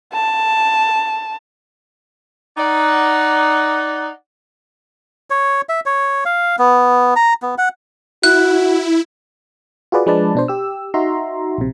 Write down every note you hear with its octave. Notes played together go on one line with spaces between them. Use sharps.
A5
D#4 D5 F#5
C#5
E5
C#5
F5
B3
A#5
B3
F#5
E4 F#4 F#6
F4 F#4 G#4 B4 D5
F3 G#3 D4 B4 D5 A5
B2 D4 C5
G4 E6
D#4 F#4 E5 A#5 C6
A#1 C3